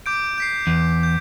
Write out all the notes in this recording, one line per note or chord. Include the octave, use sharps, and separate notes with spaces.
D6 G6 D7
G6 B6 C7
E2
G6